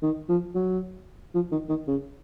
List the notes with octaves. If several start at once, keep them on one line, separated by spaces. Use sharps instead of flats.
D#3
F3
F#3
F3
D#3
D#3
C#3